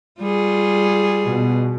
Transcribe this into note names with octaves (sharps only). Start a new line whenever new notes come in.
G3 F4 G#4
B2